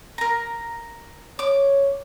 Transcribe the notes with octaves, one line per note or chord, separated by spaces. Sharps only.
A#4 A#5
C#5 D6